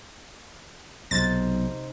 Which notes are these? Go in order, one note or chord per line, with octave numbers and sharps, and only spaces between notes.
B1 C3 D#4 C5 A6